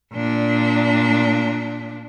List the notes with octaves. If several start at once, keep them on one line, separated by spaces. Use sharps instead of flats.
A#2 D4